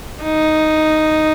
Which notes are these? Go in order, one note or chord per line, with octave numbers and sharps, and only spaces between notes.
D#4